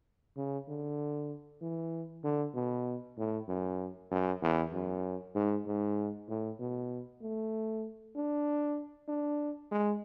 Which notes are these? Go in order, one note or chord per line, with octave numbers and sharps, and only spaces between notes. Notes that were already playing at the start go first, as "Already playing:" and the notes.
C#3
D3
E3
D3
B2
A2
F#2
F#2
E2
F#2
G#2
G#2
A2
B2
A3
D4
D4
G#3